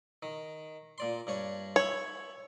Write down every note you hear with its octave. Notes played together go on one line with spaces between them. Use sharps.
D#3
A#2 D5 C6
G2 D4 C#5
C#5 E5 B5